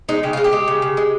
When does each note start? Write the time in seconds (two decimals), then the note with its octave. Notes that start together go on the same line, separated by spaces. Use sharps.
0.09 G#3 D#4
0.23 C#3 G4
0.33 G#3 F4
0.44 G4
0.53 G#3
0.68 C#3
0.82 C#3
0.97 G#3